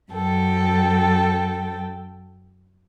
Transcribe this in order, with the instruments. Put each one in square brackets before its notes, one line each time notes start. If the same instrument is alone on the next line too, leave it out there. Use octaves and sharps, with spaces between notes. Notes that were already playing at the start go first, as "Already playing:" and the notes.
[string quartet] F#2 A4 G5